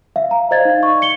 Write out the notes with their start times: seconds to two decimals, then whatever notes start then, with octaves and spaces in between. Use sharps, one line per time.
0.16 E5 F5
0.31 A#5
0.51 C5 D5 D#5 F5 G#6 A6
0.65 D#4
0.83 C#6
1.02 C#7 G7